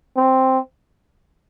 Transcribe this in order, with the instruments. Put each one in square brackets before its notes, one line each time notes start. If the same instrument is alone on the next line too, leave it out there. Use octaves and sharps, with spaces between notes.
[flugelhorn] C4